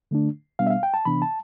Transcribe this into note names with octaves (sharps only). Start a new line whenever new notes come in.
D3 A3 D4
B2 G3 B3 D4 F5
E5
F5
G5
A5
C3 E3 B3 D4 B5
A5